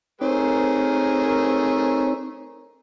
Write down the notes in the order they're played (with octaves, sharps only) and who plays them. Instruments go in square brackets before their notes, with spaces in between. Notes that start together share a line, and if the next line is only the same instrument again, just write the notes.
[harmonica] A3 G#4 C5 [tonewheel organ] C4 D#4 C#5 [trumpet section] A#4